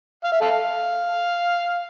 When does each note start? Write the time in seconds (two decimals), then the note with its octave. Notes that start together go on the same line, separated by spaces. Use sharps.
0.24 F5
0.32 E5
0.41 A4 F5